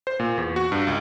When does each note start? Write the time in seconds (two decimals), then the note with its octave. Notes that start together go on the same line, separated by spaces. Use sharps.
0.07 C5
0.20 A#2
0.38 E2
0.56 F#4
0.72 G2
0.87 C#2